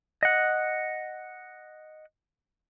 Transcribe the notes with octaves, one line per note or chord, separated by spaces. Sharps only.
D#5 F#5